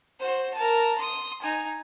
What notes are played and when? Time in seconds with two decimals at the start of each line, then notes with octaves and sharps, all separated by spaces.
0.19 F#4 C5
0.54 A#4 A5
0.98 C6 D#6
1.41 D#4 G#5